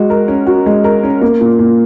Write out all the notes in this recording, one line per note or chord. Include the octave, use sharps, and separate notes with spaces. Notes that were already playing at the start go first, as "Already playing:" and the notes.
Already playing: G#3 F#4
A#4
C#4
F#4
G#3
A#4
C#4
A#3
A#2
A#2